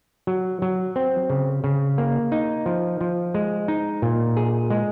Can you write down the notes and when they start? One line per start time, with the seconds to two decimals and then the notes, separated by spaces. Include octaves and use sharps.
0.27 F#3
0.62 F#3
0.96 C4
1.30 C#3
1.64 C#3
1.98 A#3
2.32 D#4
2.66 F3
3.01 F3
3.34 G#3
3.68 D#4
4.02 A#2
4.37 G#4
4.71 G#3